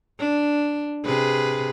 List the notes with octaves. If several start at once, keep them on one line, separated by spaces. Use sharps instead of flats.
D4
C3 G#4 B4